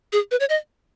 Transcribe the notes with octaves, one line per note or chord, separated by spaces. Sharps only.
G#4
B4
C#5
D#5